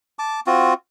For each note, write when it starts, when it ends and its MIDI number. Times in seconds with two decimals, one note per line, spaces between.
0.19 0.40 81
0.19 0.40 86
0.46 0.74 60
0.46 0.74 65
0.46 0.74 66